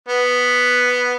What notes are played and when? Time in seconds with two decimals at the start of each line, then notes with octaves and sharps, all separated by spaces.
0.09 B3